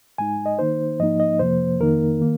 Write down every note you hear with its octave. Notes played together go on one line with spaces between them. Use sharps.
G#2 G#3 D#4 G#5
D#5
D#3 A#3 D#4 C5
G#2 F3 A#3 D#4 D#5
D#5
F2 C3 F3 A#3 C5
F2 D#3 A#3 D#4 A#4
D#3 A#3